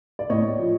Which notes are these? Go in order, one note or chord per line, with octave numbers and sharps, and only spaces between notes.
D5
A2 C#5 D#5
F3